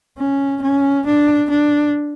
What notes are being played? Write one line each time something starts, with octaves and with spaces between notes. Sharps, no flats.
C#4
C#4
D4
D4